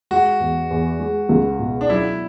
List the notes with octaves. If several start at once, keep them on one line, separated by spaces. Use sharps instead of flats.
G#3 F#4
E2
E2
G#3
C#2
B2
D4
F#3 E4